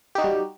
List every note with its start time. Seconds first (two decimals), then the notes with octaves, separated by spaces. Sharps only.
0.15 G4
0.18 D#4
0.21 F#4
0.24 G3